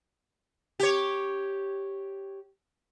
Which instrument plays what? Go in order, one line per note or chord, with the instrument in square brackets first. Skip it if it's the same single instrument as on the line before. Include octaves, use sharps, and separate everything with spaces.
[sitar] G4 C#5